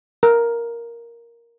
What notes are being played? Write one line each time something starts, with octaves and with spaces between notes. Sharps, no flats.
A#4